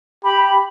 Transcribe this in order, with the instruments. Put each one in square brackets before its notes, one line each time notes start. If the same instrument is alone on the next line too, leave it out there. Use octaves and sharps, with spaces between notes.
[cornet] G4 [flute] B5
[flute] B5